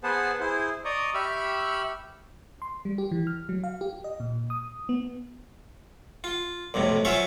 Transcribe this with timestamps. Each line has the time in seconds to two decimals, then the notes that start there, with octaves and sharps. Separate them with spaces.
0.03 B3 G#4 B4 C5 F#5 A5
0.40 E4 G#4 C5
0.85 D5 D#5 A#5 C#6 D#6
1.14 G4 E5 B5 C#6 E6 F6
2.62 C6
2.85 G3
2.98 G4
3.11 E3
3.27 F6
3.49 F#3
3.64 F5
3.81 G4
4.04 D#5
4.20 A#2
4.50 D#6
4.89 B3
6.24 F4
6.74 B1 F2 A2 C3
7.05 F#3 C#4 F4 C5 C#5 E5